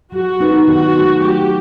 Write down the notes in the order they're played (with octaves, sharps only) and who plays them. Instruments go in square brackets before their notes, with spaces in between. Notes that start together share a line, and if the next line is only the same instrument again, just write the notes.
[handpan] F#3 [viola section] F#4
[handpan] B3 D#4 G4 B4
[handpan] D#3 [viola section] F#4
[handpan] F#3 A3
[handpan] F#3 [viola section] G4